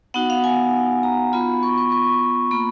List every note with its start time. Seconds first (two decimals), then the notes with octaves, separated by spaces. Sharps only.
0.14 B3 D#4 F#4 F#5
0.30 F5
0.44 G#5
1.03 A#5
1.33 B3 F4 B5
1.63 C#6
1.77 C#6
1.92 C#6
2.51 A#3 F4 B5